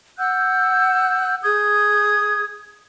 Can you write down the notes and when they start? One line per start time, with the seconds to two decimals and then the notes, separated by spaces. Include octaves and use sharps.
0.18 F#5 E6 F#6 G6
1.43 G#4 D#6 G6 G#6